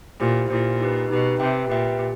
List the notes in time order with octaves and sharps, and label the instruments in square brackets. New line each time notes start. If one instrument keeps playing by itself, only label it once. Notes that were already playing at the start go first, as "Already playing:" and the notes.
[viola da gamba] A#2 [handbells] E4 G4 C5
[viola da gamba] A#2 [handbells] E4 G4 C5
[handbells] D#4 G4 B4
[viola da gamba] B2 [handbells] D#4 G4 B4
[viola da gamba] C3 [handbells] G4 B4 E5 G5
[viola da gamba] A#2 [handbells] G4 B4 E5 G5
[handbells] G4